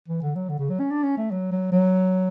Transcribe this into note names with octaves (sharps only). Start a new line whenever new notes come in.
E3
D3
F#3
D3
C#3
F#3
C#4
D4
C#4
A3
F#3
F#3
F#3